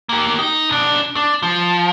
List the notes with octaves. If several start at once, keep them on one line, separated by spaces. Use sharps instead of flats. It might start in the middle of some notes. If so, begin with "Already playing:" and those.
A#3 G4
D#4
B1 D4
D4
F3